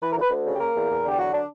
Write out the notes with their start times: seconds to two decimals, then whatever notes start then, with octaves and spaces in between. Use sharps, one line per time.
0.01 E3 B4
0.12 A#4
0.16 D2
0.22 B4
0.30 D2
0.45 C#3
0.55 G4
0.59 A#3 A#4
0.75 E2
0.90 E2
1.04 D3 G4
1.18 F#3 F#4
1.33 D4